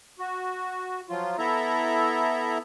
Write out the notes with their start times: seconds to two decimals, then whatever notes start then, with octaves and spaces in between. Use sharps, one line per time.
0.19 F#4
1.10 F3 F#3 F4
1.38 B3 E4 A4 E5 A#5